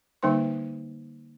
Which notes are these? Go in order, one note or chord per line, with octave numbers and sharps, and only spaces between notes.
D3 G3 A#3 D#4 C5 C6